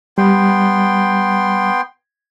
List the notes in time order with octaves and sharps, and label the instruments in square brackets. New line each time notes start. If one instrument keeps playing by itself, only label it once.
[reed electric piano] G3 [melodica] B3 G5 C6